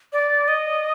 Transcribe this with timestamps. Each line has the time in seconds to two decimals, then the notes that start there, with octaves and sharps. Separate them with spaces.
0.13 D5
0.48 D#5